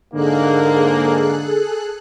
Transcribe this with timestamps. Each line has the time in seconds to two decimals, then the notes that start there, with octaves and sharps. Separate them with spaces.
0.14 G#2 D3 A#3 G#4 A4 F#6